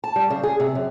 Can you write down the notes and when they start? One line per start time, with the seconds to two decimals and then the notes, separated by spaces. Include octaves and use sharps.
0.04 A5
0.16 G3
0.30 C#3
0.43 G#4
0.60 C3
0.75 F#2